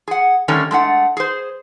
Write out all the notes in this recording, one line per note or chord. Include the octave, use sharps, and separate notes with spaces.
G#4 F#5
D3 D#3 G3 A3 C#4 C#5
G#3 A3 D4 F#5
G#4 C5